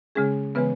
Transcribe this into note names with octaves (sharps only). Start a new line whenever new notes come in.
C#3 G#3 C#4 G#4
C#3 E3 G#3 B3 B4